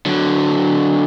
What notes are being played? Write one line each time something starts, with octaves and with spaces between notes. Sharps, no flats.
D3 F#3